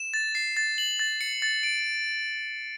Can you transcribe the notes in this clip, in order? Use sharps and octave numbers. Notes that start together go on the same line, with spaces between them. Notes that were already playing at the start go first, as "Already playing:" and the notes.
Already playing: E7
A6
C7
A6
F#7
A6
C#7
A6
D7